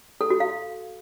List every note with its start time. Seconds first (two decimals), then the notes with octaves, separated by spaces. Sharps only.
0.21 A4
0.30 F#4
0.40 F5